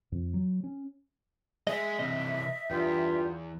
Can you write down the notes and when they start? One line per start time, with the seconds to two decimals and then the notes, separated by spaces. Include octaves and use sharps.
0.12 F2
0.34 F#3
0.64 C#4
1.67 G#3 G#4 D#5 E5
1.99 C3 E3 D#5
2.71 E2 G2 F4 G5